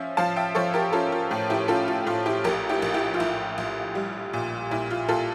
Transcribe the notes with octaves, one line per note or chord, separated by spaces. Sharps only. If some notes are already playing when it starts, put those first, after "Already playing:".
Already playing: F3 C#4 E5
F3 F5 A5
E5 G5
F3 A4 C#5
G4 A#4
C#4 F4 A4
F4
A2
E4 G4
C#4 F4 A4
F4
A2 F4
E4 G4
A#1 G4 A#4
E4 G4
A#1
E4 G4
F4
A#1 E4
A#1
G3
A#2
A#2 E4
F4
A#2 F4 A4